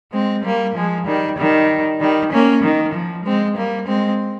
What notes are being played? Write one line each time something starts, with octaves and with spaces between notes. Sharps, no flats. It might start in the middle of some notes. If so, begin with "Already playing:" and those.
G#3 C4
G3 A#3
F3 G#3
D#3 G3
D#3 G3
D#3 G3
A#3 C#4
D#3
F3
G#3 C4
G3 A#3
G#3 C4